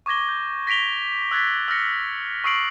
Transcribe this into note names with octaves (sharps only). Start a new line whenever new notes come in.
C#6 D6 G#6 A#6 G7
G6
A#6 B6 D7 F7 G7
E6 F#6 G#6 A6 B6
E6 F6 A#6 C#7
C#6 D#6 E6 C7 D7 F#7